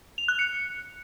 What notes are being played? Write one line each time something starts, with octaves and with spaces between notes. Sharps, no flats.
F7
F#6
C#7